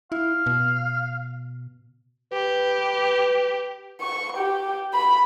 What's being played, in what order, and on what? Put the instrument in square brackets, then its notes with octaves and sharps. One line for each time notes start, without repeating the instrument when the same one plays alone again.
[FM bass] E4 [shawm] F5
[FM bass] B2
[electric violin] G4 [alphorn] B4
[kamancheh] C#6
G4
B5